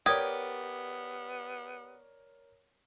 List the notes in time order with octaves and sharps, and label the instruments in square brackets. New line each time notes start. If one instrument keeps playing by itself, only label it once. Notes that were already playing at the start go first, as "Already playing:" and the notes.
[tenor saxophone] B3 [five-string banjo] G4 [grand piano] A#4 C#5 D5 [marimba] D#6 G#6